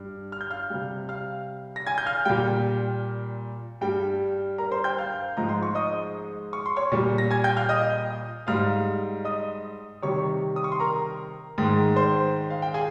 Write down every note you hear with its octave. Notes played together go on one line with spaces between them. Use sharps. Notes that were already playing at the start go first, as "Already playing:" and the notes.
Already playing: G2
F6
G6
F5 F6
C3 G3
F5 F6
A#6
G#5 G#6
G6
F5 F6
A#2 G3 G5
G2 G3 G5
A#4 A#5
C5 C6
G5 G6
F5 F6
G#2 F3 G#3 A#5
C6
C#6
D#5 D#6
C#6
C6
C#5 C#6
A#2 G3
A#6
G#5 G#6
G5 G6
F5 F6
D#5 D#6
G#2 G3 F5 F6
D#5 D#6
C3 D#3 G3 C#5 C#6
D#6
C#6
C6
A#4 A#5
G#2 D#3 G#3
C5 C6
F5
G5
G#4 G#5